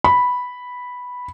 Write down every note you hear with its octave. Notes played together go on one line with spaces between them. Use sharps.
B5